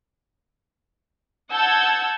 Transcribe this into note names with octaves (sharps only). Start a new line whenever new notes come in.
F#5 A5 E6 G6 G#6